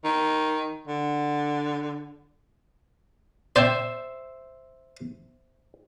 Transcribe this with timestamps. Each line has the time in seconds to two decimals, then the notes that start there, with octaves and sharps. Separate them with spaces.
0.04 D#3
0.87 D3
3.56 C5 D5 E5 G5 G#5